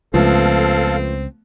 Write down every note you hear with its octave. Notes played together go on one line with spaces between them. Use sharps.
C#2 F3 A3 B3 C4 A4 F5